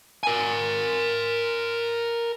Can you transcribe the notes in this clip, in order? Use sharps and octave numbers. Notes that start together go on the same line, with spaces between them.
A#4 G#5